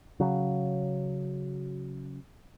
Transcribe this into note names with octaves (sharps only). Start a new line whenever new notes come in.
C#3 F#3